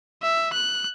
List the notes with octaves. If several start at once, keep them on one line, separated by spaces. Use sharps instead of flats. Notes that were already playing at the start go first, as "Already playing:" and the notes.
E5
F#6